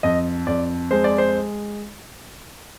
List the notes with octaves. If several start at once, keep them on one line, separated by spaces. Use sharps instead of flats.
F2 D#5
F2 D5
G#3 C5
D5
C5